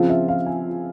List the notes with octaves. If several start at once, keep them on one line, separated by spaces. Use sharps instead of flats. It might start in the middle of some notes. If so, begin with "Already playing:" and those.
Already playing: C#3 F3 C4 F4 F5
E5
F5
G#5